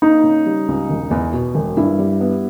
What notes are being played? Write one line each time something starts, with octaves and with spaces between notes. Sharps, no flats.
A#3 D#4
C#3
G3
C#2
E1
E2
B2
E1
G2 E4
G3
B3